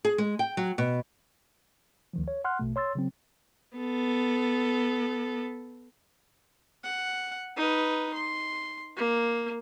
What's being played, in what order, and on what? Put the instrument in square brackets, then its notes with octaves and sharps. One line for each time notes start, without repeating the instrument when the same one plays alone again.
[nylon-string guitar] G#4
G#3
G5
F#3
B2
[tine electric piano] D2 D#3 F3
C#5
F#5 C6 F6 F#6
A#1 B2 A3
C#5 C6 E6 A6
C#3 F#3 C4
[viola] B3 A4
[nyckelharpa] F#5
D#4 B4
C6
A#3